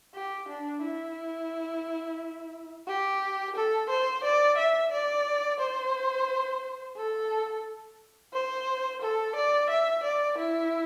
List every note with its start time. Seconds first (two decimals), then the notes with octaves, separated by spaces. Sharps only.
0.14 G4
0.48 D4
0.83 E4
2.87 G4
3.55 A4
3.89 C5
4.23 D5
4.58 E5
4.92 D5
5.60 C5
6.97 A4
8.33 C5
9.01 A4
9.35 D5
9.69 E5
10.03 D5
10.38 E4